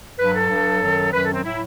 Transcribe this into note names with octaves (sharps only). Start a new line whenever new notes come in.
G2 F#3 B4
A4
G2 F#3
F#2 D#3 F#3
F#2 D#3 F#3 B4
A4
C4
A2 F#3 E4